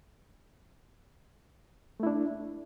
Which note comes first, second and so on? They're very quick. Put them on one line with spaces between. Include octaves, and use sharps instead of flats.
A3 E4 D4